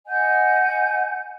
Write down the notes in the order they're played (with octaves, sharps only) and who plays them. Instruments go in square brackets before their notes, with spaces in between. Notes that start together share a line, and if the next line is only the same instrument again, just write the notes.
[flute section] D#5 F#5 G#5 G6